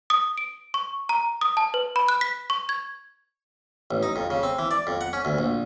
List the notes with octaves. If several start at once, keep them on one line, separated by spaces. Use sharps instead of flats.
D#6
D7
C#6
A#5
D#6
A5
B4
B5
F#6
B6
C#6
G#6
A1
D#4
F2
C#3
C4
E3
D5
F2
F#5
C#4
D2
A#1